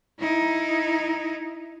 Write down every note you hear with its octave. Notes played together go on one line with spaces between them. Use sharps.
D#4 E4